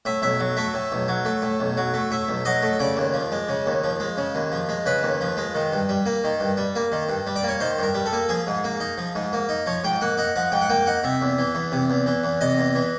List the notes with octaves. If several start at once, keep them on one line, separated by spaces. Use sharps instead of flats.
A2 E5
B1 E5
F#3
A3 E5
A2
B1
F#3
A3
A2
B1
F#3
A3
A2 E5
B1
F#3 D#5
A3
C#3 D5
D#2
F3
G#3
C#3
D#2
F3
G#3
C#3
D#2
F3
G#3
C#3 B4
D#2
F3
G#3
D#3
G2
G3
A#3
D#3
G2
G3
A#3
D#3
G2
G3
D5
A#3 C#5
D#3 C5
G2 A#4
G3
A4
A#3
F3 G#4
G#2
A#3
D#4
F3
G#2
A#3
D#4
F3 C#5
G#2 G5
A#3 F#5
D#4 F#5
F3 F#5
G#2 G5
F#5
A#3 G5
D#4 F#5
C3 E5
E2
E3
E2
C3
E2
E3
E2
C3 D#5
E2
E3